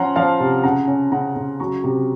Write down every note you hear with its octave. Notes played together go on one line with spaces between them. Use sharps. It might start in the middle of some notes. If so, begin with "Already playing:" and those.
Already playing: F3 C#4 F#5 A#5 C6
F3 F5 A5
C3
C#3 F#5 A#5
C#4
C#3 F#5 A#5
C#3
F#3 A#5 C#6
C3